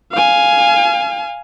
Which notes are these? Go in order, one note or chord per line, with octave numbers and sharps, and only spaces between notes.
F5 G#5